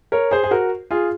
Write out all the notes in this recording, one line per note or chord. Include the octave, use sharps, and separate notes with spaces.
A#4 C#5
G#4 C5
G#4
F#4 A#4
F4 G#4